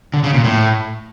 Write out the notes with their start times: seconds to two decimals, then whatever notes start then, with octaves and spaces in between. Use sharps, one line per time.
0.14 D3
0.24 C#3
0.34 A#2
0.44 A2